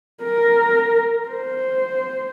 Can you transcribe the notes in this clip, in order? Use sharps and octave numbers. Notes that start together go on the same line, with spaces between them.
A#4
C5